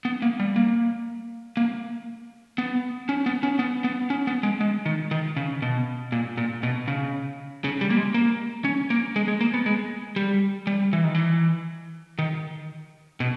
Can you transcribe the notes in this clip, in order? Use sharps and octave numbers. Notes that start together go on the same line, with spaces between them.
B3
A#3
G3
A#3
A#3
B3
C#4
B3
C#4
B3
B3
C#4
B3
G#3
G#3
D#3
D#3
C#3
B2
A#2
A#2
B2
C#3
C#3
G3
A#3
G#3
A#3
C#4
A#3
G#3
G#3
A#3
B3
G#3
G3
G3
E3
D#3
E3
D#3
B2